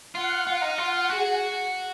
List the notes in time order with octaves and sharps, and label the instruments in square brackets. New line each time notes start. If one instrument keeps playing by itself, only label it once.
[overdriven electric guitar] F4 [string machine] F#5
[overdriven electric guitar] F4 [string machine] F5
[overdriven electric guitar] D#4
[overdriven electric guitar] F4 [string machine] F#5
[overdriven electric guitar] F#4 [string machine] G#4